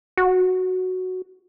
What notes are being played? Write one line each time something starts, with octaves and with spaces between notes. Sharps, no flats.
F#4